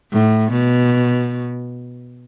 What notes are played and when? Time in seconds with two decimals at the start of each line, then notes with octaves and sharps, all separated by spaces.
0.12 A2
0.53 B2